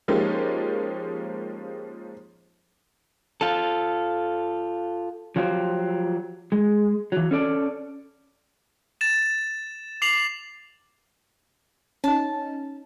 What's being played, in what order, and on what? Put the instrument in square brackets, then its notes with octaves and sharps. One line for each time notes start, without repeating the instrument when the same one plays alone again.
[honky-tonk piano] F3 G#3 A#3 C#4 D#4 G4
[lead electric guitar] F4 A4
[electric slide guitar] F3 F#3 F4 G4 C5
G#3
E3 F#3
C#4 A4 D5
[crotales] A6 E7
D6 C7 F7 F#7
[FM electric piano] C#4 D#4 [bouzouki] A5